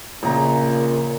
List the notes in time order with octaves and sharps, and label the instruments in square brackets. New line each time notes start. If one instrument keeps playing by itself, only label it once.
[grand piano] A#1 C#3 A#5 [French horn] A#2